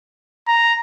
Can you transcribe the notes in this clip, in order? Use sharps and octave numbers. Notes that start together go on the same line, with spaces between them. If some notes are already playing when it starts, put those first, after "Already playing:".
A#5